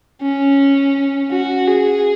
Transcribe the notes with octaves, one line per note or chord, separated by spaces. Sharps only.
C#4
F#4
G#4